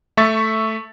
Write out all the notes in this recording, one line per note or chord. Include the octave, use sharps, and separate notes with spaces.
A3 E5 C#6 A6